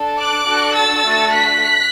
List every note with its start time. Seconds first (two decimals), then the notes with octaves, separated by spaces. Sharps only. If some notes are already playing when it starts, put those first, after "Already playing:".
Already playing: D4 A4
0.18 D6 F#6
0.47 D4 F#4 A4
0.76 E6 A6
1.05 A3 D4 F#4 A4
1.34 F#6 B6